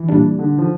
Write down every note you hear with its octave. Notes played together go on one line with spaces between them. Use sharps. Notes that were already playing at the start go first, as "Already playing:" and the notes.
Already playing: E3
A#2 G3 D4
D3
F3